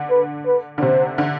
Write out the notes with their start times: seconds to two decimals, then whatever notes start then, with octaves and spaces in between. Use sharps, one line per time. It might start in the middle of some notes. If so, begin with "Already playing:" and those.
Already playing: D3
0.11 B4
0.47 B4
0.78 D3
0.82 C3 C5
1.18 D3